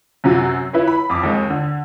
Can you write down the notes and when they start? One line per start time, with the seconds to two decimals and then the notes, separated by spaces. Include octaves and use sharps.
0.24 F#2 C3 F#3
0.73 E4 B4 C#5
0.88 B5
1.10 F2 D6
1.23 D#2 G#3
1.50 D3